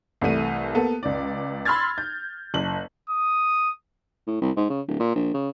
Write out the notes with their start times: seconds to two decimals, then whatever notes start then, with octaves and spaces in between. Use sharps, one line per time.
0.21 C2 E3 A3 D#7
0.75 A#3 B3 A4
1.03 C#2 D5
1.65 B5 C6 E6 F6 G#6 A6
1.98 G6
2.54 F#1 F#7
3.10 D#6
4.27 A2
4.41 C2
4.57 G#2
4.70 C#3
4.88 D1
5.00 A#2
5.15 A#1
5.34 C#3